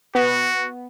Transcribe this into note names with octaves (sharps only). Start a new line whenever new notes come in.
B3 F#4